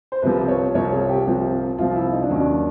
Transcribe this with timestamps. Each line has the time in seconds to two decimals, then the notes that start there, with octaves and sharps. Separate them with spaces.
0.12 C5
0.22 C2 C3 F3 B4
0.48 C#5
0.74 C2 C3 F3 C#5
0.93 G#4
1.09 G4
1.26 C2 C3 F3
1.78 C2 C3 F3 F4
1.95 E4
2.13 D#4
2.23 D4
2.30 D#2 D#3 F#3 C#4
2.40 D4